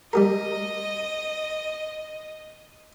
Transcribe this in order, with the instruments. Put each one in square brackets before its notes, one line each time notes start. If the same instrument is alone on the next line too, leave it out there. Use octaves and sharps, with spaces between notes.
[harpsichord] G3 G4 A#4 [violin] D#5